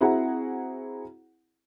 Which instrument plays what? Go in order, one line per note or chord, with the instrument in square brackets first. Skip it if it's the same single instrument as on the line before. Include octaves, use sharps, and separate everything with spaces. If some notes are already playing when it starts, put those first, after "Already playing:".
[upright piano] C4 E4 F#4 G#4 F#5 A#5